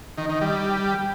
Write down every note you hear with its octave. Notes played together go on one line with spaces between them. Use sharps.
D#3
D#3
G3